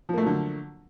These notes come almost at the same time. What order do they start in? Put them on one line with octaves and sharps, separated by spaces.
F3 A#3 A3 F#3 D3